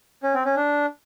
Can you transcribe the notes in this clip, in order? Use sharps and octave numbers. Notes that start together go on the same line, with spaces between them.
C#4
C4
C#4
D4